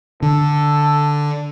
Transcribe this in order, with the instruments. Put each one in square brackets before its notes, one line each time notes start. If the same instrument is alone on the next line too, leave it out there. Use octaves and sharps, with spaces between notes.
[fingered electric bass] D3 [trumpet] A4